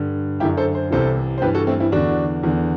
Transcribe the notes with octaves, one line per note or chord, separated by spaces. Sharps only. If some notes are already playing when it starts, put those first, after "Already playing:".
Already playing: G2 D3
F#2 D3 E4 G4
A4 C5
C5
C2 C3 E3 A4 C5
C5
G2 E3 G4 B4
F#4 A4
A3 C4
C4 E4
E2 D3 D4 F#4
E2 D3